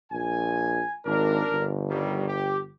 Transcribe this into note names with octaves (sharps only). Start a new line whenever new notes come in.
A#1 G#5
G#1 D4 A#4
G1
D#3 F#3 G3
G4